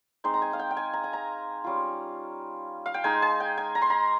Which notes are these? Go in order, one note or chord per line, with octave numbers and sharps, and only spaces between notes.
G#3 C4 D#4 C6
A#5
G#5
F5
G5
G5
G#5
A#5
G#5
A#5
G3 C#4 F4
F5
G5
G#3 D#4 G#5
G#5
G5
G#5
A#5
C6
A#5